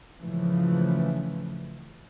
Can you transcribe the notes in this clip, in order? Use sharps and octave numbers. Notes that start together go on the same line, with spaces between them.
G#2 C#3 E3 F3 A3